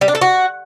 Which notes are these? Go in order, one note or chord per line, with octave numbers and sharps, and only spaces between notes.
G3
D4
A4
F#4